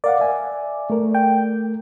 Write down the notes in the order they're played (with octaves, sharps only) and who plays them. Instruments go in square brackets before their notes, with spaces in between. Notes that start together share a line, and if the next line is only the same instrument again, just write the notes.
[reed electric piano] A#4 F5 F#5 [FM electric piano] D5
[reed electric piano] E5 G#5
A3 A#4
[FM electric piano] G5